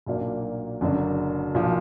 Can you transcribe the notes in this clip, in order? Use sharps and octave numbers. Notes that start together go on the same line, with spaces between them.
B1 A#2 F#3 A#3 D4
F#1 F#2 D3 F#3 D4
B1 A#2 F3